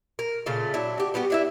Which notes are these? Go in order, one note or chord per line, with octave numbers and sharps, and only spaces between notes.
A#4
A#2 C#3 A3 F4
F#3 D4 E4
F#4 G4
G3 B3 F#4 G4
D4 E4 E5